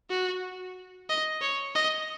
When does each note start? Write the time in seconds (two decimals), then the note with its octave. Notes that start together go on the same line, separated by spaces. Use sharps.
0.10 F#4
1.09 D#5
1.41 C#5
1.75 D#5